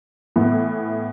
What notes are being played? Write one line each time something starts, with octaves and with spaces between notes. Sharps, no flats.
A2 E3 B3